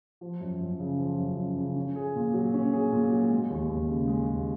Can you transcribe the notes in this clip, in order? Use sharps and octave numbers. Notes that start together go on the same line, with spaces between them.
F3
F#2
F#2
C#3
F3
F#2
F#2
C#3
C#4
G#4
A#2
F#3
C#4
G#4
A#2
F#3
G#3
D#2
D#2
C#3
G#3
D#2